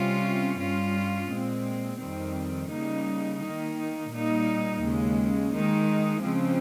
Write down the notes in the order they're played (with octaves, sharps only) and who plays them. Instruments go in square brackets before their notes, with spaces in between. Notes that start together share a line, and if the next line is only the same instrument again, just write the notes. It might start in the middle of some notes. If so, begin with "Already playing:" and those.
Already playing: [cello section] C3 G3 C#4 F4
G2 G3 C#4 F4
A#2 G#3 C4
F2 D#3 G3 C4
C#3 G3 A#3 D#4
D#3 A#3 D#4
A#2 G3 A#3 D#4
D#2 C#3 G#3
D#3 G#3 D#4
C#3 F3 G#3 C4